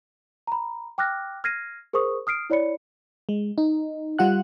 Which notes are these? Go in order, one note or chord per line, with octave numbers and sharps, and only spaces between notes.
A#5 B5
G5 D6 F6 F#6 A#6
F6 G#6 A#6 C7 D#7
G#4 A#4 C5 C#6 D#6
D#6 F6 C7 D7
E4 C#5 D5 B5 C#7
G#3
D#4
G3 F4 F#5 F#6